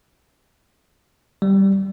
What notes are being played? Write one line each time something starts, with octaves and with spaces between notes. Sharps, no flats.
G3